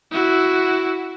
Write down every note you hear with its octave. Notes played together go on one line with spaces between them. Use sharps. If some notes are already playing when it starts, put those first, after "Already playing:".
E4 F#4